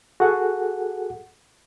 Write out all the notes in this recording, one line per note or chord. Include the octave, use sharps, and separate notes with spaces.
F#4 G#4 A4 F#5